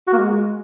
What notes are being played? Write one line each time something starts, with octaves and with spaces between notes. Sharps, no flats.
F#4
A#3
G#3